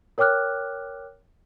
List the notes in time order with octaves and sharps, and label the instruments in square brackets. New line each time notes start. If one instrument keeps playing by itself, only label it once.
[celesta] A#4 C#5 G5 D6 F6 F#6